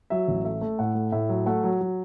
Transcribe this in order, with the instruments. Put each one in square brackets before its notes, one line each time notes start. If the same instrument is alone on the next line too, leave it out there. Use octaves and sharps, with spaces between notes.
[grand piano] F#3 E5
A1
A3 E5
A3
A2 F#5
A3
A2 E5
F#3
A3 F#5
F#3
F#3